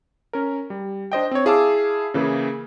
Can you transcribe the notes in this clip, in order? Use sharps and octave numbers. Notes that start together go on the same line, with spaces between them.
C#4 A#4
G3
D4 C5 D#5 G5
C4 C#5
E4 G#4 F5 A5 D6 E6
C#3 E3 A#3 E4 G#4